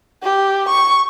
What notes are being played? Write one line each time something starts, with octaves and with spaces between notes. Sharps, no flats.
G4
C#6